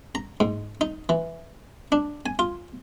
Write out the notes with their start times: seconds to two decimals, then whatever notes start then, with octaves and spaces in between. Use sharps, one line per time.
0.15 A#5
0.40 G#2
0.81 D#4
1.09 E3
1.92 D4
2.26 G#5
2.39 F4